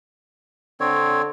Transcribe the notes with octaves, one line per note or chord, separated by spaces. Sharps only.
D3 C4 C#5